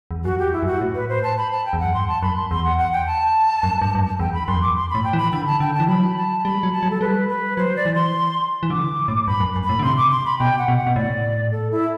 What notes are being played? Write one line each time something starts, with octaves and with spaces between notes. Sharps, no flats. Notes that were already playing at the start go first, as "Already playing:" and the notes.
E2
F#2 F#4
G4
E4
F#2
F#4
A2
B4
C5
A5
B5
A5
G5
E2
F#2 F#5
G2 C6
A5
F#2 B5
C6
E2 C6
F#5
F#5
G5
A5
F#2
G2
G2
F#2
E2 G5
B5
F#2 C6
E2
F#2 D6
C6
A2 B5
G5
E3
B5
D3 B5
A5
D3 G5
A5
E3
F#3 B5
A5
G3 B5
F#3
A5
F#3
A4
G3 B4
B4
F#3 C5
D5
E3
C6
E3
D3 D6
A2
G2 B5
F#2
F#2
B5
A2
D3
C3 C6
D6
C6
B5
B2 G5
F#5
B2
F#5
B2
A2 D5
A4
E4